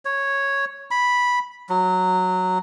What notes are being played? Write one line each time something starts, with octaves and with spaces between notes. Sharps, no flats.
C#5
B5
F#3